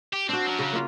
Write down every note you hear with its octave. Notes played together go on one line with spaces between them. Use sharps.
G4
C4 D4 F#4
F#3 A#4
C#3
A#3 F4